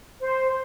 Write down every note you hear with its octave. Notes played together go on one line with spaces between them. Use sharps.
C5